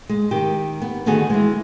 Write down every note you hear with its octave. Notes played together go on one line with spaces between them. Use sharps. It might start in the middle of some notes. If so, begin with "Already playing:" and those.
G#3
D#3 G4
B3
D3 D#3 B3 F#4 G#4
E3 G#3